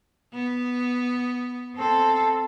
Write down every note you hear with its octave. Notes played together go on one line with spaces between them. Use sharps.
B3
C4 A4